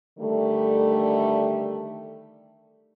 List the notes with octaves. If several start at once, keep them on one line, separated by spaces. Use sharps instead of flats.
D3 D#3 G3 A3